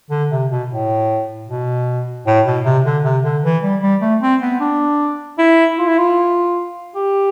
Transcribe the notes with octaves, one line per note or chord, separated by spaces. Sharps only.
D3
C3
B2
A2
B2
A2
B2
C3
D3
C3
D3
E3
G3
G3
A3
C4
B3
D4
E4
F4
E4
F4
G4